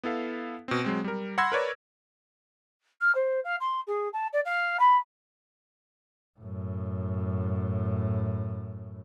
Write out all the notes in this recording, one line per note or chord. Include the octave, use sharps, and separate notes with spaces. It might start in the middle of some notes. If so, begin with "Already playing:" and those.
B3 E4 A4 F5
B2 C4
F#3 G#3 C4
G3 A#4
F#5 B5 C6 E6 G#6 A#6
A#4 B4 C#5 D5
F6
C5
F5
C6
G#4
A5
D5
F5
B5
F#2 A2